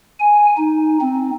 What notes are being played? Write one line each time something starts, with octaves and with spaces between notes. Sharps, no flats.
G#5
D#4
C4